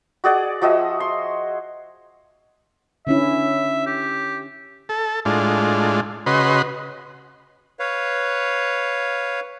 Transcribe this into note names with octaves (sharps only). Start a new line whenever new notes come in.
F#4 G#4 D5 F#5
F3 F#4 D#5 E5
C6
D3 C#4 E4 E5
G4
A4
A2 G#3 D4 F4
C#3 F#4 B4 D#5 C6
B4 C#5 F5